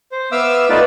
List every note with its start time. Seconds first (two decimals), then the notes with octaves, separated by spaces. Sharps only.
0.12 C5
0.32 B3 E5 F5 D6 E6
0.69 A3 B3 D#4 F4 B4 D5